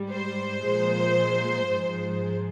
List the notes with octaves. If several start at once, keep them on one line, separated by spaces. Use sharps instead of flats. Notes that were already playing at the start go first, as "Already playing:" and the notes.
Already playing: G#2 G3
C5
A#2 F3 G#3
G#2 F3 G#3